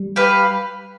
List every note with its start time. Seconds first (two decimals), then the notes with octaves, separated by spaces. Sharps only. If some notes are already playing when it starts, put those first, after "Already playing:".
Already playing: G3
0.16 G4 B4 F5